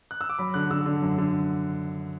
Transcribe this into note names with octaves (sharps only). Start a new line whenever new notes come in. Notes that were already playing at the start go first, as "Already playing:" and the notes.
F#6
E6
D6
F#3 B5
D3 F#6
D3 E6
D3
F#2
D3